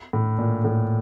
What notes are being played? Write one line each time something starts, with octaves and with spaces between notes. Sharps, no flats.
A2
A#2
A2